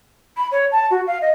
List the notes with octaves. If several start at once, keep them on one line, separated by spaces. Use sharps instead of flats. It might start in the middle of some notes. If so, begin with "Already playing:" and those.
B5
C#5
A5
F#4
F5
D#5